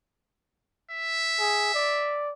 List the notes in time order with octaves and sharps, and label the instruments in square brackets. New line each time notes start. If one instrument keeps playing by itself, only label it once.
[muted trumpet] E5
[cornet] G#4
D5